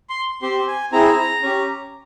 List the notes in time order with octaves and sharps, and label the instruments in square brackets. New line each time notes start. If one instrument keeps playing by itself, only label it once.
[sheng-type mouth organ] C6
C4 G4 C6
G#5
C4 E4 G#4 A#5
C#4 G4